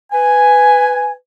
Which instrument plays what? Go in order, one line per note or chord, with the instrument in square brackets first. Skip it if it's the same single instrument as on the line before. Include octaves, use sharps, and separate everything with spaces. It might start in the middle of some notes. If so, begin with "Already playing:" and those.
[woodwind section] B4 G#5